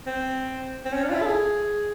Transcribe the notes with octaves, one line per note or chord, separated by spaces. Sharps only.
C4
C4
C#4
D4
F4
E4
A4
G#4